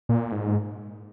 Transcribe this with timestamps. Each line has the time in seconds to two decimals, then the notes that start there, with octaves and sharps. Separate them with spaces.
0.09 A#2
0.32 G#2